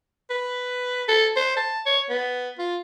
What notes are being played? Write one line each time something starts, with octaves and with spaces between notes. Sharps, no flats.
B4
A4
C5
A5
C#5
B3
F4